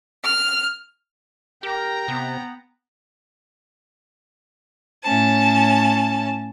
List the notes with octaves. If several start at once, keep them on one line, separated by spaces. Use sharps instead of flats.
F6
G4 A#4 G5 A#5
C3 B3
A2 C#4 A5